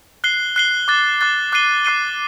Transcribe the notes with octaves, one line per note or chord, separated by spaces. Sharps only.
F#6 C7 G7
F#6 C7 G7
D6 F#6 A6
D6 F#6 A6
D6 F#6 C7 D#7 G7
D6 F#6 C7 D#7 G7